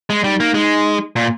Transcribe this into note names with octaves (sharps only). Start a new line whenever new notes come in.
G#3
G3 D#4
A#3
G#3
A#2